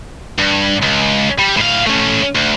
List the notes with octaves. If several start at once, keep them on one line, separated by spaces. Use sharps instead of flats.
G2
C#2
G3
A2 F5
A3 C#4
D2